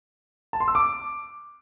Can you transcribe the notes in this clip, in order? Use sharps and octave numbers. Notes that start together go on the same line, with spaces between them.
A5
C6
E6
D6